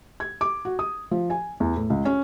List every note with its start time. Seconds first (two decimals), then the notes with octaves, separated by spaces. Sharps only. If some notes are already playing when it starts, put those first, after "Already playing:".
0.20 G#6
0.41 D6
0.65 F#4
0.79 D#6
1.11 F3
1.30 G#5
1.60 E2
1.76 A2
1.90 C#2
2.05 C#4